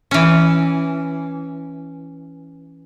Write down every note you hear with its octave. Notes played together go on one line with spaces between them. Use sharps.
E3 C#4